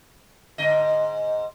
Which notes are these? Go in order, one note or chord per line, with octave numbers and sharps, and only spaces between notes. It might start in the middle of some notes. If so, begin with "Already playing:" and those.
G#2 D3 D#5